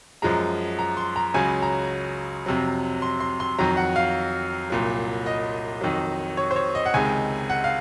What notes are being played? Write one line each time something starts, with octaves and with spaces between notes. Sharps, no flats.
F#2 F3 G#3 A#5
A#5
C6
A#5
C#2 C#3 F#3 G#5
A#5
F2 C3 F#3
C6
C6
C6
F2 D#3 F#3 A#5
F#5
F5
C2 A#2 F#3
D#5
F2 D#3 F#3
C#5
C5
C#5
D#5
F#5
C#2 C3 D#3 G#3 G#5
F#5
F5